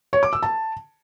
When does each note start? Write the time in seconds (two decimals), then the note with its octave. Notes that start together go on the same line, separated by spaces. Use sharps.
0.13 C#5
0.23 D6
0.33 E6
0.43 A5